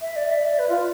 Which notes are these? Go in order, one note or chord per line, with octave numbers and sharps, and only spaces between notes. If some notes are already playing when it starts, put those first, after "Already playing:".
E5
D5
E5
D5
B4
F4